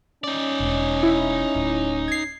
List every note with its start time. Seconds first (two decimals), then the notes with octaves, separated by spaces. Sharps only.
0.24 C#4 D#4 D5
0.59 E1
1.03 E4
1.55 D1
2.08 G#6 C7